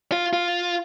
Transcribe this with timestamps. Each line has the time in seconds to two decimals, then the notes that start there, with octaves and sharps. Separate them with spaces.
0.12 F4
0.33 F4